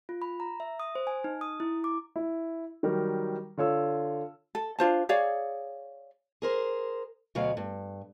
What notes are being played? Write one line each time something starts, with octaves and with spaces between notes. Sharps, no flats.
F4
B5
A#5
E5
D#6
C5
G#5
D#4
D#6
E4
D6
E4
D#3 F#3 G3 A#4
D3 F4 C#5 E6
A4
D4 F4 C5 A5
G#4 C#5 D5 F5
G#4 A#4 C5
D2 B2 F#3 F5
G2